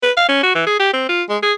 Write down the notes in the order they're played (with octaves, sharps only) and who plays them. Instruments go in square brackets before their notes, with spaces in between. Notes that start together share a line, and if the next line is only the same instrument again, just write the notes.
[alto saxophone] B4
F5
C#4
F#4
E3
G#4
G4
C4
F4
G#3
G#4